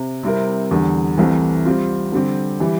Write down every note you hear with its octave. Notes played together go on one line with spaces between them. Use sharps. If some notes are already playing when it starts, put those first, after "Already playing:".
Already playing: C3
C3 G3 C4 E4 A#4
E2 D3 G3
C2 C3 E3 A3
G3 C4 F4
D3 G3 C4 G4
E3 G3